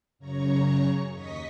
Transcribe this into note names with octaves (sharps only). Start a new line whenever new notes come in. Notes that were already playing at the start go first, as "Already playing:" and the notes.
F#2 C#3 C#5 A#5 C#6
D#2 D#5 C#6 D#6 B6